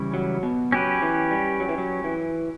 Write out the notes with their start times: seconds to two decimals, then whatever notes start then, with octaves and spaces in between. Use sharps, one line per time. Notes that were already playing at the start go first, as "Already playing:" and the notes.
Already playing: C#3 E3 G3 C#4 E4
0.14 F#3
0.43 B2
0.72 F#3 C#4 G4 B4
1.02 E3
1.31 G3
1.60 F#3
1.69 E3
1.78 F#3
2.04 E3